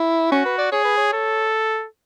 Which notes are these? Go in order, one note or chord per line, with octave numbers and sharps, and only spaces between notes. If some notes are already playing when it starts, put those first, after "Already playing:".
Already playing: E4
C#4 F#4
B4
D5
G#4 C#5
B4
C#5
A4